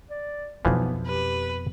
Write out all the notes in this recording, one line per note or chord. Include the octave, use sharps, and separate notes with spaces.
D5
B1 F2 B2 E3 F3 B3
G4 B4